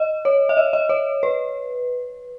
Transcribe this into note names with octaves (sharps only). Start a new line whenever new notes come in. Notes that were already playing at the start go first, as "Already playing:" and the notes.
Already playing: D#5
C#5
E5
D#5
D#5
C#5
B4